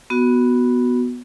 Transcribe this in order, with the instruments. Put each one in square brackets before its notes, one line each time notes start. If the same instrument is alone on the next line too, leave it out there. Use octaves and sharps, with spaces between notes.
[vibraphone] B3 F#4